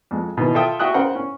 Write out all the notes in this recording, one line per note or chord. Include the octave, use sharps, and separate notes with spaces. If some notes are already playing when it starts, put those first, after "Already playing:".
F2 G#3
B2 D#3 E3
F4 A4 E5 G5 D#6
F#4 E5 G5 D#6 F#6
C#3 A#4 C5 F#5 G5
C#4